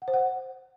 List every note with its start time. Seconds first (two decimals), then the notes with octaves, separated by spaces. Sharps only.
0.02 F#5
0.08 C5
0.14 F#5